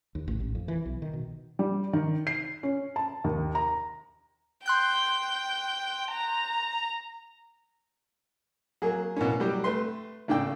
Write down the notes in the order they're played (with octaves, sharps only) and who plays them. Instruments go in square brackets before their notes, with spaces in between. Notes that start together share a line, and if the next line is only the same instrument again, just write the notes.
[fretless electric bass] D#2
A1
A1
F2
E3
B1
D#3
B2
[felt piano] G3
D#3
C7
C#4
A5
D#2
A#5
[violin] G5 [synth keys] C6 F#6 G6
[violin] A#5
[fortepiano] F#3 A#3 G#4
B2 E3 A#3 C#4
F#3 G3 G4
A3 B4 C6
G#1 G#2 C#3 D5 G5 E6